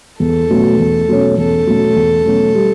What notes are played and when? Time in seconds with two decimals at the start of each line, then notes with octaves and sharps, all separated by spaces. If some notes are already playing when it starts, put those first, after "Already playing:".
0.20 E2 A4
0.49 B2 F#3 A3 C#4
0.79 E2
1.09 B2 F#3 A3 C#4
1.38 E2 A4
1.67 B2 F#3 A3 C#4
1.96 E2
2.25 B2 F#3 A3 C#4
2.55 G3